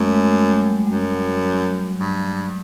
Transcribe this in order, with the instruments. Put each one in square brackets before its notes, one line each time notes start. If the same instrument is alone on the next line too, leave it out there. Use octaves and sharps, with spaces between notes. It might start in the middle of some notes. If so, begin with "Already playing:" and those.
Already playing: [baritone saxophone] F#2 [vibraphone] G#3 A3
[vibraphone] F#3
G3
G3
G#3
[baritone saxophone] F#2 [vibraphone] G3
[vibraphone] F#3
F#3
[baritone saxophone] G2